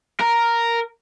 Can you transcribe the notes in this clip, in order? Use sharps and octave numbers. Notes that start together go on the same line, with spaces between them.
A#4